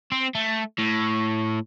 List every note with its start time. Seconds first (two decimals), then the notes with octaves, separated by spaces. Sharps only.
0.12 C4
0.35 A3
0.79 A2